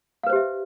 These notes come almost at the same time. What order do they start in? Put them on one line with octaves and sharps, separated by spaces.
F5 B4 C5 G4 E5